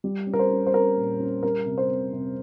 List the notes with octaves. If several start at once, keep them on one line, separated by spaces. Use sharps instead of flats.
G3
C#4
A#4
C5
C#4
C5
C#4 A#4
A#2
C#4
G3 A#4
C3
C5
C3
C3